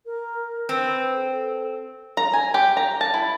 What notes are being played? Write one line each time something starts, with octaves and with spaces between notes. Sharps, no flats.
A#4
C4 B4
A4
A#5
G#5
G4
A#5
A5
E4